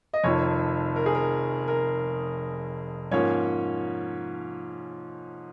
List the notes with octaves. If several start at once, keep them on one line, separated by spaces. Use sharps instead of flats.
D#5
F1 F2 D#3 C#5
A#4
G#4
A#4
A#4
G#2 F3 A#3 C#4 C#5